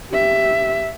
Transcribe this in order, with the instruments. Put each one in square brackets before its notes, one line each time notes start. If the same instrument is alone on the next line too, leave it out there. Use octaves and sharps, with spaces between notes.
[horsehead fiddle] G4 E5